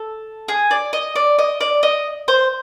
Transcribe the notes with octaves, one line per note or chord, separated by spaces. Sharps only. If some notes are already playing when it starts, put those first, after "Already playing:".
Already playing: A4
G#4
D5
D#5
D5
D#5
D5
D#5
C5